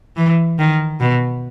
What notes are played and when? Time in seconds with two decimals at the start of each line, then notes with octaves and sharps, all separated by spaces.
0.17 E3
0.59 D#3
1.00 B2